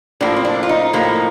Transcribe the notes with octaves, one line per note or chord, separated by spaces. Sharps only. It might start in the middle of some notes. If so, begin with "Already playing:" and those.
A2 F3 A#3 D4
C4
D4
F4
D#4
A2 F3 A#3